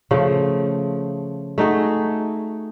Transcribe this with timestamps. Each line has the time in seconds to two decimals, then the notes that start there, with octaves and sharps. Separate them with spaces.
0.11 C#3 F3 A3
1.58 A3 D#4 F#4 G#4